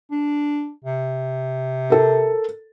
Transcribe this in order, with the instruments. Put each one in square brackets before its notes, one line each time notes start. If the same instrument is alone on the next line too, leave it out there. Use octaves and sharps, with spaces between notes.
[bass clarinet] D4
C3
[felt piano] A4 A#4